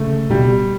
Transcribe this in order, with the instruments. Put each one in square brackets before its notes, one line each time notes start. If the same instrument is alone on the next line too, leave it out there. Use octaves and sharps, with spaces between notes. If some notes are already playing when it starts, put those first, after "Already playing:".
Already playing: [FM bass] C#3 [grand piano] A3
[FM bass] B2 [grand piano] G3